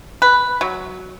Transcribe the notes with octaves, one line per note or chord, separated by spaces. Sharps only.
B4
F#3